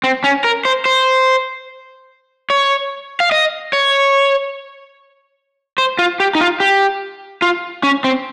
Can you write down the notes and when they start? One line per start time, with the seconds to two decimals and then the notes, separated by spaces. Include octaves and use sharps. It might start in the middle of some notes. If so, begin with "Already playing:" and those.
0.04 C4
0.24 C#4
0.44 A#4
0.65 C5
0.85 C5
2.50 C#5
3.20 F5
3.32 D#5
3.73 C#5
5.78 C5
5.99 F4
6.20 G4
6.35 D#4
6.40 F4
6.60 G4
7.42 F4
7.83 C#4
8.04 C4